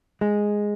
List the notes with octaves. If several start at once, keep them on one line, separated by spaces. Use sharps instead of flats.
G#3